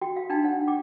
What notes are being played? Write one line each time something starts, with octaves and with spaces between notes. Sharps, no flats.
F#4 G5
F5
D4 D#4 F5 G5
C#5 F#5
G5 D6